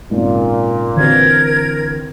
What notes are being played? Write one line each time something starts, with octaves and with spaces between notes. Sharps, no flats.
G#1 A#2 C#3
D3 E3 C4 F#4 A#4 B4 G#6